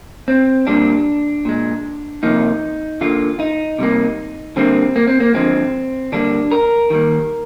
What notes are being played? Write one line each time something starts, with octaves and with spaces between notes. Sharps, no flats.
C4
A#2 G3 A#3 D4
A#2 G#3
C3 F3 A#3 D#4
D3 G3 A#3 F4
D#4
C3 G3 A#3
D3 G3 A#3 C4
A#3
C4
A#3
D3 F3 G#3 C4
D3 G3 A#3 D4
A#4
D#3 G3 A#3